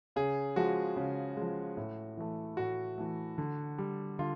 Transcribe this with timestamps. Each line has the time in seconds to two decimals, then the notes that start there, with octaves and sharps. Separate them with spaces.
0.16 C#3 G#4
0.56 F3 G#3 F#4
0.96 C#3
1.37 F3 G#3
1.77 A2
2.17 E3 A3
2.57 A2 F#4
2.98 E3 A3
3.38 D3
3.78 G3
4.19 D3 F4